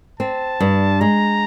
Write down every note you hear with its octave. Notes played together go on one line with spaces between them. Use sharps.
C4 A5
G2
G#3 A#5